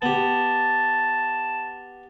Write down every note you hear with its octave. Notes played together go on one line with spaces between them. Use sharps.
B3 G4 A5